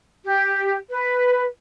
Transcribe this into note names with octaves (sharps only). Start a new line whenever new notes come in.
G4
B4